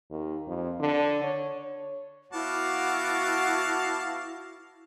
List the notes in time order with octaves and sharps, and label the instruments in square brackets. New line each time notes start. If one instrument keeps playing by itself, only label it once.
[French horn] D#2
F2
D3
C#5
C#5
[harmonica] B3 A5 D6 [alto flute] E4 [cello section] F#4 [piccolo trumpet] F5